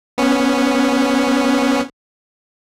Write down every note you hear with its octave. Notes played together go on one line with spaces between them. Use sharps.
B3 C#4